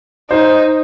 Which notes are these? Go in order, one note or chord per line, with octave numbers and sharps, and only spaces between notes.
D#4 C5